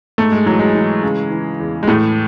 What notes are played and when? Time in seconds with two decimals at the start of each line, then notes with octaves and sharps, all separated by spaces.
0.18 G#2 A3
0.32 G#3
0.46 E3 F#3
0.59 G#3
0.75 E3
1.03 C#3
1.31 E3
1.60 E2
1.83 G#3
1.87 A2 E3 A3